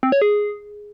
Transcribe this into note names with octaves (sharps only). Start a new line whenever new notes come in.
C4
C#5
G#4